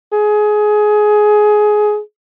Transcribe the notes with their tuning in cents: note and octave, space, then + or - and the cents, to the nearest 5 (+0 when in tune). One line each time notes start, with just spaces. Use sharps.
G#4 +20